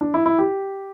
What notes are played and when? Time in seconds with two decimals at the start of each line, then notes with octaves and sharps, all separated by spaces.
0.01 D4
0.14 E4
0.26 E4
0.39 G4